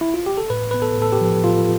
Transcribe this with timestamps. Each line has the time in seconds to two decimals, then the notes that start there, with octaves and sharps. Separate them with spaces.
0.01 E4
0.14 F4
0.26 G4
0.37 A4
0.50 A2 B4
0.71 B3 B4
0.82 A4
0.98 A2 A4
1.12 G4
1.21 F3
1.44 A2 F4